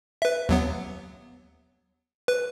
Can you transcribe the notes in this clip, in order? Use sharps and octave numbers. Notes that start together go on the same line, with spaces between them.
B4 E5
D#2 F#3 B3
B4